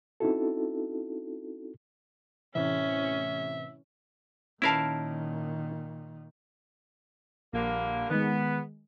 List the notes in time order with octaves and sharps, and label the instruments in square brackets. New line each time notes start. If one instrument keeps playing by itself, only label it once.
[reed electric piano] C4 C#4 D#4 E4 F#4 A4
[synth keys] A2 C3 E3 [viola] C#4 [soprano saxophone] E5
[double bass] A#2 D#3 [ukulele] C#4 B4 A5 [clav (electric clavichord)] E4 A#4 F5
[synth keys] A#1 [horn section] D3 G3 A#3
[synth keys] D#3 G#3 [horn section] B3